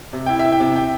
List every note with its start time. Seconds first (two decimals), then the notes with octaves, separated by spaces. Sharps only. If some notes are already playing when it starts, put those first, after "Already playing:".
0.13 C3
0.26 E4 G5
0.39 E5
0.45 E4
0.52 G5
0.60 C3
0.76 G5